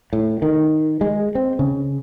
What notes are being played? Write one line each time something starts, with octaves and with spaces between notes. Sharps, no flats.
A2
D#3
G#3
C4
C#3